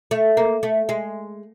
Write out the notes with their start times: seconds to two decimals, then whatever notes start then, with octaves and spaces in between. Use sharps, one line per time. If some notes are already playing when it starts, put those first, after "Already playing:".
0.11 A3
0.37 A#3
0.63 A3
0.89 G#3